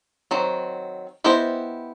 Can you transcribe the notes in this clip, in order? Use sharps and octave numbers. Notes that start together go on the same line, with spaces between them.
D#3 F#3 C4
B3 E4 G4 C5 D#5